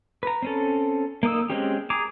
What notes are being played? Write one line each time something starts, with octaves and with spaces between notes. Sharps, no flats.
B4 A#5
C4 C#4 A4
A#3 D#4 D#6 E6
G#3 C4 C#4 G4
G#4 A#5 D6